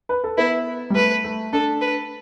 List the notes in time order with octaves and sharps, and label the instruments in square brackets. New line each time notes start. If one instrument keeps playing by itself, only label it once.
[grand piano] B4
A4
[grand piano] B3 [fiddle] E4
[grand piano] G3
[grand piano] A3 [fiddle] B4
[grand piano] A3
[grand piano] D4 [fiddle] A4
[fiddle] B4